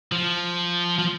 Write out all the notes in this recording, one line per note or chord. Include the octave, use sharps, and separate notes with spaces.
F3
F3